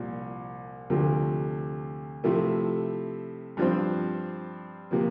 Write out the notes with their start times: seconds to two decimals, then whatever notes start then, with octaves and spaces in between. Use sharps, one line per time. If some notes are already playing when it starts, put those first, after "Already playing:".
Already playing: C2 A#2 F3
0.90 D2 C3 F3 A3
2.24 C3 F3 A3 E4
3.57 G2 F3 C4
4.91 C3 F3 A#3